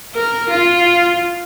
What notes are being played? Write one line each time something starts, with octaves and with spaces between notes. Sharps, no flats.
A#4
F4